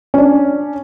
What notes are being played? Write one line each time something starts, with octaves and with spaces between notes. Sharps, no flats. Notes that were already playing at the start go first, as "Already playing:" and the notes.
C#4 D4